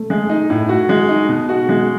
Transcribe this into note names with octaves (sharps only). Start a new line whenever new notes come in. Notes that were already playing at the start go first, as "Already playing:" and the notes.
Already playing: A3
G#3
D#4
A2
F#4
G#3
D#4
B2
F#4
G#3